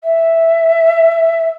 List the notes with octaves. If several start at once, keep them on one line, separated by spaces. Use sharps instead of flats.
E5